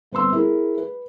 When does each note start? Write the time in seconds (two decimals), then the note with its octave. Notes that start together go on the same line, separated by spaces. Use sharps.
0.12 G1 C4 B4 C6 E6
0.32 E4 G#4 A#4
0.78 B4